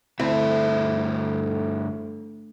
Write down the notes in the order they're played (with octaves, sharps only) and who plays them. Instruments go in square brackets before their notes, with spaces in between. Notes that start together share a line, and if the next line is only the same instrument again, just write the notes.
[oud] D2 [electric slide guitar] G2 A3 E5 [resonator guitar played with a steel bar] C4 E4